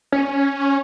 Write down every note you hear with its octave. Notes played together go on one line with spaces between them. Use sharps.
C#4